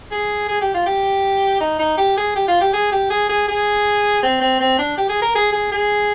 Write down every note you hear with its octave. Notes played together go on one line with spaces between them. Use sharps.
G#4
G#4
G4
F4
G4
D#4
D#4
G4
G#4
G4
F4
G4
G#4
G4
G#4
G#4
G#4
C4
C4
C4
D4
G4
G#4
A#4
G#4
G#4
G#4